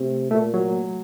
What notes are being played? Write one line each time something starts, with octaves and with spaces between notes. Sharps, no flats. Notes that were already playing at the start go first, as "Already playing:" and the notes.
Already playing: C3 A3 C4
A#2 A3
F#3